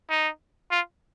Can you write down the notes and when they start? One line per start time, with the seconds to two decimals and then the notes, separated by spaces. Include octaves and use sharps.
0.10 D#4
0.71 F4